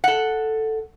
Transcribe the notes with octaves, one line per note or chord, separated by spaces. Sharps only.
A4 F#5